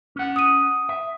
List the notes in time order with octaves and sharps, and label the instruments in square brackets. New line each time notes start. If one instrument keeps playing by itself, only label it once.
[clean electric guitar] C#4 F#5
[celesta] D#6 D#7
[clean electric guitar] E5